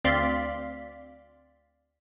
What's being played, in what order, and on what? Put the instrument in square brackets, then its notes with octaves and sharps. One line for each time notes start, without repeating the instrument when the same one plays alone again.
[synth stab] D2 C4 D5 F5 C6 B6